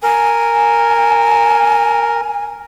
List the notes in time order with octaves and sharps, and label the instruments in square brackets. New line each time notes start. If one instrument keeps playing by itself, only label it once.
[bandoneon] A#4 [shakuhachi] G#5